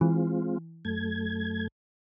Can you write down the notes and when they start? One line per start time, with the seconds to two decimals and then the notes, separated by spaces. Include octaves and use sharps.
0.01 E3 G#3 C4 F4
0.85 F#2 A3 G#6